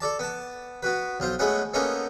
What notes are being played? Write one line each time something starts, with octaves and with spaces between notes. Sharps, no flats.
A4 D5 A5
B3 A5
B3 F#4 B4
B1 F4 C5
G#3 A3 B3 C#4 F#5
A#3 B3 C#4 D#4 A4